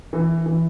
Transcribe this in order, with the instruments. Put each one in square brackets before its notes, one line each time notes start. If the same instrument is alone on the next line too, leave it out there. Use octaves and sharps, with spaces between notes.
[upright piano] E3
E3